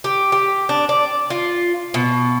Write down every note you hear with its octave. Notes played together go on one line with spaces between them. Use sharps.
G4
G4
D4
D5
F4
B2